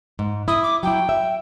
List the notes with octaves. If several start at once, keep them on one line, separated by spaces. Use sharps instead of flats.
G#2
E4 D#6
D6
F#3 E4 G5
E5